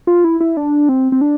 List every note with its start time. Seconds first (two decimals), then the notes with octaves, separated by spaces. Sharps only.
0.07 F4
0.24 E4
0.41 E4
0.57 D4
0.89 C4
1.12 C4
1.21 D4